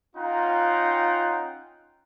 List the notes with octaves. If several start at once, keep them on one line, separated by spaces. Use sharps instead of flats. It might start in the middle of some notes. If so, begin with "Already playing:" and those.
C#4 D#4 F4 F#5 G5 A#5